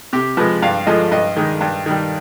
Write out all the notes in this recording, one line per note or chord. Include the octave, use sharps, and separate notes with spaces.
C3 G4
F3 G#3 B4
G2 F5
D3 F3 G#3 D#5
G2 D#5
D#3 G#3
G2
D#3 G3